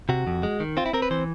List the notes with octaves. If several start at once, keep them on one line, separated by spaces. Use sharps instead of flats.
C3 F#4
F2
G#3
D#3
C4 F4
E4
C4 A#4
B4
E3 C5